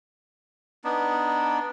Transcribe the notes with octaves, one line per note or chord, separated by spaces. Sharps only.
B3 D4 D#4